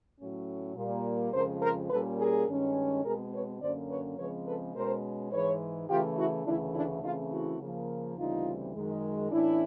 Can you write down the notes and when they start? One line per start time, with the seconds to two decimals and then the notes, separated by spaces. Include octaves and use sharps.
0.19 A2 F#3 A3 C#4
0.76 A#2 G3 A#3
1.33 F2 C#3 F3 G#3 A#4 C5
1.61 A#4 C5
1.90 A#2 G3 A#3 C#4 A4 B4
2.19 G#4 A#4
2.47 G2 D#3 G#3 C#4
3.04 B2 G#3 C4 G#4 A#4
3.32 B4 C#5
3.61 F#2 D3 F#3 A#3 C#4 C5 D5
3.89 B4 C#5
4.18 C#3 F3 G#3 C4 B4 C#5
4.46 A4 B4
4.75 B2 G#3 C#4 A#4 C5
5.31 G#2 E3 G#3 B4 C#5
5.89 C#3 E3 A3 F4 G4
6.17 E4 F#4
6.45 D2 C#3 E3 A3 D4 E4
6.74 D4 E4
7.03 C#3 E3 A3 C4 D#4 F4
7.31 E4 F#4
7.60 C#3 F3 A#3
8.17 D2 C#3 E3 G3 C4 D#4 F4
8.74 F#2 D#3 G#3
9.31 A2 E3 A3 C#4 D4 E4